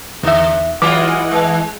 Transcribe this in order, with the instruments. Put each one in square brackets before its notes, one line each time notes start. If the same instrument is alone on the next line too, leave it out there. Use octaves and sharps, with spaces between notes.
[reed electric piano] E2 E5 [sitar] D3
[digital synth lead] E3 [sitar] F#3 G#3 F4 [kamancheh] D#5 F#5 [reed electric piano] D6
[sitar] G#3